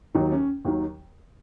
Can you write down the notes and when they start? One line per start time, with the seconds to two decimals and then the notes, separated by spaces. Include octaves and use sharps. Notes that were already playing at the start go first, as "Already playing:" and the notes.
0.14 D#2 D#3 F#3 D#4
0.32 C#4
0.65 D#2 D#3 F#3